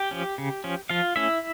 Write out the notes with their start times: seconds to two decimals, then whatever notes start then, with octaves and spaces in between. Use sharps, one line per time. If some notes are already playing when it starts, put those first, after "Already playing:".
Already playing: G4 G5
0.11 F3 C#4
0.38 C#3
0.64 F3 C#4
0.89 F3 F4 F5
1.16 A3 C#4 E4 E5